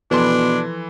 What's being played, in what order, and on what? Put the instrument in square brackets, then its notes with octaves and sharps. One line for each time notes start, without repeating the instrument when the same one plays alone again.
[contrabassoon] B2 [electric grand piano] E3 C6 [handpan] F3 A4 B4 [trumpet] D4